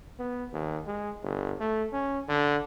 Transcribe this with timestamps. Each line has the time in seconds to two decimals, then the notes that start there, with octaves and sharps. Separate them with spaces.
0.19 B3
0.53 D#2
0.87 G#3
1.23 G1
1.60 A3
1.93 C#4
2.29 D3